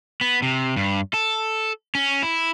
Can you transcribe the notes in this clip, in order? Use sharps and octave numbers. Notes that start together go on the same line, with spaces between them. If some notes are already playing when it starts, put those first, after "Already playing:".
B3
C3
G2
A4
C#4
E4